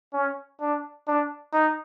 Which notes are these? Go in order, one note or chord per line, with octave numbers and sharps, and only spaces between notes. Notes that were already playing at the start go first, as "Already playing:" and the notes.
C#4
D4
D4
D#4